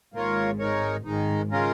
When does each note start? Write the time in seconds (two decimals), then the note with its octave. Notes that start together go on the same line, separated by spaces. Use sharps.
0.14 G#1 G#2 A#3 F4 A#4 C#5
0.59 G#3 D#4 A#4 C#5
1.05 G#1 G#2 D#3 G#3 D#4
1.51 C#3 G#3 C#4 F4 A#4